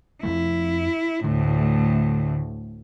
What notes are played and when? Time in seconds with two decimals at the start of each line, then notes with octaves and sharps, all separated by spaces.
0.23 F2 F3 A3 E4
1.24 D2 A2 D3